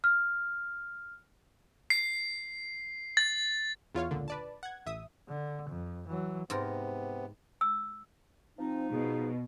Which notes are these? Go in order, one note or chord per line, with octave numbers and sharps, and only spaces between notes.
F6
C7
A6
E2 F4 C#5 F5
C#2 A#2 D3
B4 D5 A5
F#5 G#6
A1 E5 D#6
D3
F2
E3 F#3
G#2 C3 B3 A#4
E6
F3 C4 D#4
B2 G#4